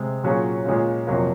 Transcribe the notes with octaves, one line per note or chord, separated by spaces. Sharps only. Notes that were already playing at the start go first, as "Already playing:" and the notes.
Already playing: C3 G#3 C4
A#2 F#3 C#4 F4 G#4
A#2 G#3 C#4 F4
F2 C3 F#3 A#3 F4